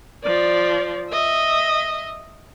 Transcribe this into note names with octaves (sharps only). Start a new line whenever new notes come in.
F3 D5
D#5 E5